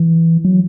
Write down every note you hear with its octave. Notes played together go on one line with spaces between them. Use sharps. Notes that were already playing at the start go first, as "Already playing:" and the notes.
Already playing: E3
F#3